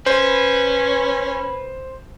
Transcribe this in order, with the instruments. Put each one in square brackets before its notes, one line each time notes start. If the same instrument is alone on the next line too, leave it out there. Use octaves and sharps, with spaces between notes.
[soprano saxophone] C#4 [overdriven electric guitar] B4 [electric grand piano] C5